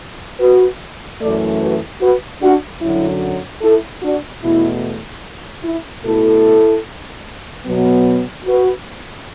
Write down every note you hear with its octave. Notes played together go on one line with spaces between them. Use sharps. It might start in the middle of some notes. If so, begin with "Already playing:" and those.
F#4 B4
F#2 E3 A3 A4 D5
F#4 B4
F#4 B4
D4 F#4
F#2 D3 F#3 E4
E4 A4
D4 F#4
E2 B2 A3 E4
E4
B2 A3 E4 A4
B2 F#3 B3
F#4 B4